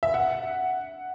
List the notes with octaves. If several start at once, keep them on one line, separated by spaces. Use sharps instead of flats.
E5
F#5